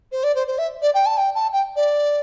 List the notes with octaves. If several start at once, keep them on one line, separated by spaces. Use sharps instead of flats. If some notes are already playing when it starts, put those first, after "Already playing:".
C5
D5
C5
C5
E5
D5
G5
A5
G5
A5
G5
D5